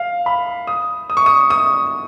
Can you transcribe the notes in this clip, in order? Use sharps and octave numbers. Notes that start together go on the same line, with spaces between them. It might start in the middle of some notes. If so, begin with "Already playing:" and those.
Already playing: F5
B5
D#6
D#6
C#6
D#6
D#6